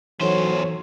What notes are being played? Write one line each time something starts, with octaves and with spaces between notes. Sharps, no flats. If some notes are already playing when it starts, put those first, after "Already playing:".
E2 E3 F#3 D#4 A4 C5 C#5